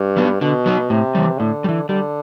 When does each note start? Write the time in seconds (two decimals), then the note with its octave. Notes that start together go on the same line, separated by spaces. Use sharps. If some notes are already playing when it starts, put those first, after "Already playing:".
Already playing: G2
0.17 F#3 B3
0.41 B2 D3
0.66 F#3 B3
0.90 A2 C3
1.15 E3 G3
1.39 A2 D3
1.64 G3
1.69 E3
1.89 D3 G3